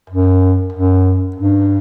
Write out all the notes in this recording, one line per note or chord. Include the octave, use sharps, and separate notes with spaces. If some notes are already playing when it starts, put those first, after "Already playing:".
F#2
F#2
G2